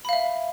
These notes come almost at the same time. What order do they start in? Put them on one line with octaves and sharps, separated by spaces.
B5 F5 E5